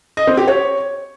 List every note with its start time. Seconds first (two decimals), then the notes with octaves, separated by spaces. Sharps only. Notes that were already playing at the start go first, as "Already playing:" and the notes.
0.17 D#5
0.27 C4
0.37 G4
0.47 C#5